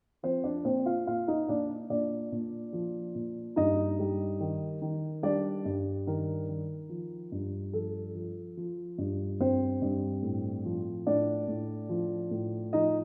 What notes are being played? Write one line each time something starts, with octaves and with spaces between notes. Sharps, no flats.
F3 C4 C5
D4 D5
A#2 C4 C5
F4 F5
A#2 F4 F5
D#4 D#5
A#2 D4 D5
A#2 D4 D5
A#2
F3
A#2
G2 D#4 D#5
G3
D#3
D#3
G3 D4 D5
G2
D#3 A#4
D#3
F3
G2
F3 A4
F3
F3
G2
G2 C4 C5
G2
A2
F3
A2 D4 D5
A2
F3
A2
F3 D#4 D#5